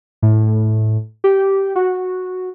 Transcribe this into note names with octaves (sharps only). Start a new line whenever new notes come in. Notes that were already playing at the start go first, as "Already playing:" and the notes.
A2
G4
F#4